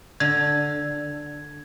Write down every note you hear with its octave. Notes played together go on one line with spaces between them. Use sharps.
D3 G#6